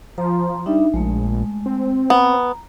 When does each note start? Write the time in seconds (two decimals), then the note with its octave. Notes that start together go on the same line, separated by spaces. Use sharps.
0.18 F3 A#5 C6
0.66 G3 D4 D#4 E5
0.94 A#1 G#3 A3
1.66 C4
2.10 B3 A#5